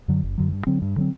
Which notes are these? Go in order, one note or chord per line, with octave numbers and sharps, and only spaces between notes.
F#2 D3 F#3
F#1
F#2 D3 F#3
G2
D3 F#3 C4
G2
D3 F#3 C4